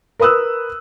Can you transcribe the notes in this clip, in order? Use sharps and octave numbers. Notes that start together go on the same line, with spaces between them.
A#4 B4 B5 D#6 E6 F#6